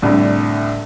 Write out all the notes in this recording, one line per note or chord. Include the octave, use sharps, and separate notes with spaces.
C2 A2 D3